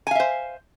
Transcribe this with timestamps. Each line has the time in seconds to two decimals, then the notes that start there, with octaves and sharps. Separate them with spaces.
0.07 G#5
0.11 F5
0.15 E5
0.20 C5